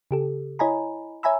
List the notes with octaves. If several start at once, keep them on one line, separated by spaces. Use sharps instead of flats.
C#3 G4 A4
E4 C#5 D#5 G#5 A#5 B5
C#5 E5 G#5 A#5 B5 E6